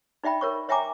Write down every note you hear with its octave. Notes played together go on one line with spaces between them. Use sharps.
D#4 D5 E5 G5 B5
A#4 C#5 C#6
C#5 E5 G5 G#5 A#5 D6